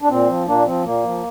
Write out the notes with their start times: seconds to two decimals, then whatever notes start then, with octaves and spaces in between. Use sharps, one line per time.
0.02 D4
0.09 A#2 C4
0.28 F3
0.47 A#2 A#3 D4
0.66 F3 C4
0.84 A#2 A#3
1.04 F3